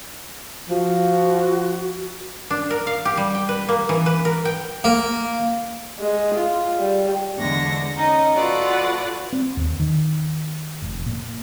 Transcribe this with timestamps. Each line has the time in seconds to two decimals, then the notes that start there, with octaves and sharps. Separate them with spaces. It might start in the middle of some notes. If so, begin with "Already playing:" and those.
0.69 F3 F#4
2.50 D4
2.70 A#4
2.87 F5
3.05 G4
3.17 G3
3.35 G5
3.49 B4
3.69 A#3
3.89 E3
4.06 B4
4.25 A#4
4.45 G5
4.84 A#3
6.00 G#3
6.35 F4
6.79 G3
7.37 E2 D3 G#3 D4 C#6 A#6
7.96 C#4 D#4 D#5
8.35 F4 F#4 A4 B4 D5 F#5
9.33 C4
9.57 D#2
9.80 D#3
10.82 F1
11.06 A#2